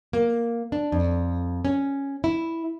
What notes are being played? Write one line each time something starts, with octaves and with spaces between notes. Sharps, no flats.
A#3
D4
F2
C#4
E4